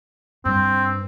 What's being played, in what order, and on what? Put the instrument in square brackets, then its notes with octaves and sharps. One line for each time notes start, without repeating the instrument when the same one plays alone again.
[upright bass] G2 [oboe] C4